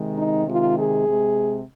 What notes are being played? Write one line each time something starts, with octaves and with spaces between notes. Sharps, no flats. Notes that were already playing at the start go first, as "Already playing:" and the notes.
Already playing: C3 D#3 G#3
D#4
C3 D#3 G#3 F4
G#4
C3 G#3